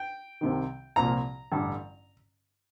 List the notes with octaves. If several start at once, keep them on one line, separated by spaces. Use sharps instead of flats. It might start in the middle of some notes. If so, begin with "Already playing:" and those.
Already playing: G5
C2 C3 D#3
C2 A#2 F3 A#5
A1 G2 D3